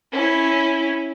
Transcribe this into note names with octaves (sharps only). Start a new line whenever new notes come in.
C#4 E4